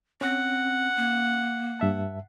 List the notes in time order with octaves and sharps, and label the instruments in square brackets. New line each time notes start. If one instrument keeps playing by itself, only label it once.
[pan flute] C4 [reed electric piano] C#4 [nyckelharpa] F#5
[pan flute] A#3
[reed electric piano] G2 E5 A5